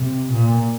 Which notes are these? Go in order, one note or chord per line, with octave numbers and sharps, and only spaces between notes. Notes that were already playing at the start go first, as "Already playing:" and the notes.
Already playing: C3
A#2